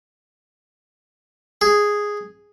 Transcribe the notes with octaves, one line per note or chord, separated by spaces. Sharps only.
G#4